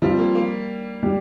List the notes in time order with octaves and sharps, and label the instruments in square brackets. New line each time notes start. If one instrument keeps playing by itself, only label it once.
[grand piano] F3 C4 F4 [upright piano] G3
[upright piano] A#3
A#3
[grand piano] G3